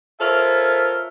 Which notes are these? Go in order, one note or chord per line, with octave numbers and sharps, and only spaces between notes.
F4 A4 A#4 C5 C#5 E5